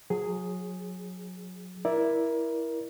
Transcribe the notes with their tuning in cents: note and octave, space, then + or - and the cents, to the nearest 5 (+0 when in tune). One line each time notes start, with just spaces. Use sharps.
F#3 -30 G#4 +0
E4 +0 A#4 +25 D5 +0